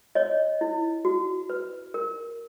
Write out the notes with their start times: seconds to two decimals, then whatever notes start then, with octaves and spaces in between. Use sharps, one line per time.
0.15 C#5 D#5
0.61 E4
1.05 F#4
1.50 B4
1.94 A#4